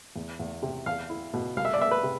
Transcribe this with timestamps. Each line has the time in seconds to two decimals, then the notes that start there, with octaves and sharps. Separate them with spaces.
0.16 E2
0.40 E2
0.62 C3
0.86 E2 F5
1.10 E4
1.33 B2
1.56 C2 F5
1.65 E5
1.74 D5
1.80 B3 E5
1.91 B4
2.03 C3